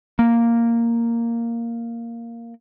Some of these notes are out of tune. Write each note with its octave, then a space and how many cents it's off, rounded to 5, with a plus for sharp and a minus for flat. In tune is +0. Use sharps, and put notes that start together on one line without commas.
A#3 -5